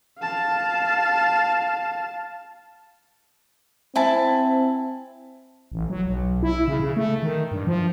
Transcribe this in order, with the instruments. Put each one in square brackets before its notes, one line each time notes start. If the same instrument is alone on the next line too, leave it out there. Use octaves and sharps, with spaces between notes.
[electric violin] F5 A5
[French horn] C4 [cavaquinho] E4 G#5 A5
[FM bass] A1
F#3
B1
E4
C#3
C#3
A3
D#3
G2
F3